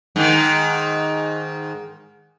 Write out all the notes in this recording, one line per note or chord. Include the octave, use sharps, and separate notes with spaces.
G#2 D#3